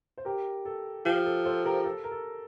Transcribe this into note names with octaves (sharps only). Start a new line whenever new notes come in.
C5
G4 A#4
A4
F3 G4
A4
A4 C5
G4 A#4
A4
A#4
A4